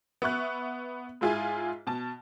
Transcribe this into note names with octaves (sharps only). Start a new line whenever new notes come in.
B3 E5 C#6 F#6
G#2 E4 F4 G#4 G#5
B2 A5